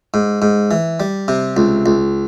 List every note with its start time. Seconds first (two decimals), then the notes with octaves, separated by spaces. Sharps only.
0.14 G#2
0.42 G#2
0.71 E3
1.00 G3
1.28 C3
1.57 C#2
1.86 C#2